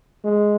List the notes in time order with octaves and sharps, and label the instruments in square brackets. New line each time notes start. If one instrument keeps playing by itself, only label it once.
[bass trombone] G#3